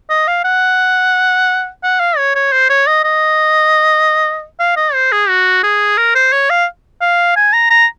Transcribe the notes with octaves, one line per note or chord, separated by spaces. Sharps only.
D#5
F5
F#5
F#5
F5
C#5
C#5
C5
C#5
D#5
D#5
F5
D#5
C5
G#4
F#4
G#4
A#4
C5
C#5
F5
F5
G#5
A#5
A#5